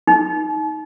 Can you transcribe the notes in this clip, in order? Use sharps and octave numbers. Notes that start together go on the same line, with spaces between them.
D#4